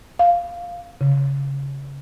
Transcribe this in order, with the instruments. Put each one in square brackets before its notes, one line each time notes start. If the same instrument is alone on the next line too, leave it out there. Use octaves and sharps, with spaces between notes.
[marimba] F5
C#3